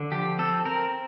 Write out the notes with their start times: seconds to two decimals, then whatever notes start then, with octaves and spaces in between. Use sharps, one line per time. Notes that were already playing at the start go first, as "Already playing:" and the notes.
Already playing: D3
0.12 F3 G4
0.39 C4 A4
0.65 C4 A#4